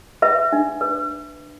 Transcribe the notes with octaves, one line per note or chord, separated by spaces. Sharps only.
B4 E5
D4
B4